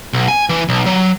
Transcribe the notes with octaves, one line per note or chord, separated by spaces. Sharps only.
B1
G#5
E3
B1
F#3